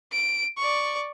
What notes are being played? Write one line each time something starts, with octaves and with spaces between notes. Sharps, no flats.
D7
D5 C#6